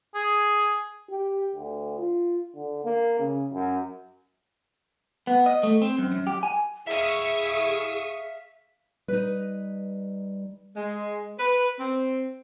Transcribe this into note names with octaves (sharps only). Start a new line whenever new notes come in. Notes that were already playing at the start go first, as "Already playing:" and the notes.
G#4
G4
D2
F4
D3
A#3
C#3
F#2
B3
D#5
A3
C4
F#2
F#2
G4
G#5
E4 G#4 E5 F5 C#6 D#6 E6
G3 D#4 B4
G#3
B4
C4